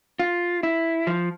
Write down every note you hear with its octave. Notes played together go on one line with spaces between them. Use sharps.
F4
E4
F3